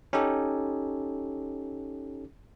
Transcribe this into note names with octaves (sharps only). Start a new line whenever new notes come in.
C#4 D#4 G4 A4